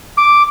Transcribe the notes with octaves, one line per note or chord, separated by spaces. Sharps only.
D6